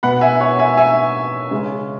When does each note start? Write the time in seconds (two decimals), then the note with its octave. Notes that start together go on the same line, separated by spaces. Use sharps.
0.03 B2 B3 F#5 B5
0.21 E5 G#5
0.40 C#5 F#5
0.59 E5 G#5
0.77 E5 G#5
1.51 C#3 G#3 C#4